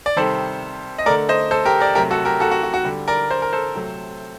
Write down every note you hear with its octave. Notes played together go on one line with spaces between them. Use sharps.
D5
C3 D#3 G3 A4 C5
D#5
D3 A3 A#4 D5
C5 D#5
A4 C5
G4 A#4
A#4 D5
C3 F#3 A3 G4 A#4
F#4 A4
G4 A#4
F#4 A4
F#4
F#4
F#4
D3 G3
A#4 D5
C5
A#4
A4 C5
C3 F#3 A3